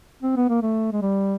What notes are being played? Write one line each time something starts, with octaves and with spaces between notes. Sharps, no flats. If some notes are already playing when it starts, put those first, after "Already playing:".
C4
B3
A#3
A3
G#3
G3